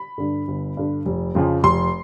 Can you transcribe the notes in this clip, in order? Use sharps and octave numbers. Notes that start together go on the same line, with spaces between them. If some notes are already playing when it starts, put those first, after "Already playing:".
Already playing: B5
G2 D3
G1
G2 D3
F1
F2 C#3 F3
F1 C6